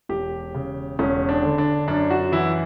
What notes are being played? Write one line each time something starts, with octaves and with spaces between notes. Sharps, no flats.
E1 G4
C#3
E1 C#4
D4
D3
D4
F#2 D4
F#4
E3 E4